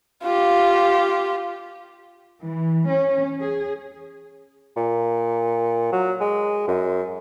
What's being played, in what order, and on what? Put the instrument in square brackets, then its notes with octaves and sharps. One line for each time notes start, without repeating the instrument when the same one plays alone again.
[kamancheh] F4 G4
[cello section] E3
C#4
G#4
[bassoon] A#2
F#3
G#3
F#2